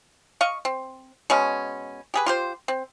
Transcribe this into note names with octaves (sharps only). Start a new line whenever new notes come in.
D#5 F5 C#6
C4
B2 G#3 C#4
G4 G#4 B4
F4 G4 C5
C4